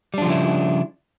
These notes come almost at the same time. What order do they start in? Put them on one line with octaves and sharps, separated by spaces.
G3 D4 F3 C#3 E4